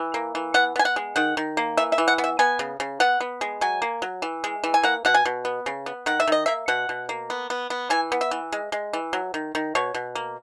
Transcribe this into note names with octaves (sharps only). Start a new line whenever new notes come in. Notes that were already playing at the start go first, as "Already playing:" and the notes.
Already playing: E3
A#3
E3
B3 F#5
B3 G#5
F#5
G#3
D#3 F#5
D#3
A#3
E3 E5
E5
E3
F#5
B3
E5
B3 G#5
C#3
C#3
B3 F#5
B3
G#3
F#3 G#5
A#3
F#3
E3
G#3
E3
G#5
A#3 F#5
B2 F#5
G#5
B2
B3
C#3
B3
D#3 F#5
E5
D#3 D#5
A#3 E5
B2 F#5
B2
A#3
B3
B3
B3
E3 G#5
B3
E5
E3
G#3
G#3
E3
F#3
D#3
D#3
B2 C#5
B2
A#3